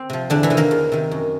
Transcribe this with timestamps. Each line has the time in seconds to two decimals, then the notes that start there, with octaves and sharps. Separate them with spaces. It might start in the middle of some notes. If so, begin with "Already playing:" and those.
Already playing: C4
0.10 C3 F3
0.30 E2 D3 D4
0.43 E3 E4
0.50 C3 D#3
0.57 A#3 A#4
0.71 E2
0.92 C3 D#3
1.11 F#2